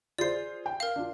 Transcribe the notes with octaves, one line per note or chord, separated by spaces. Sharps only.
F4 G#4 C5 D5 C7
G5
A#4 F5
D4 F4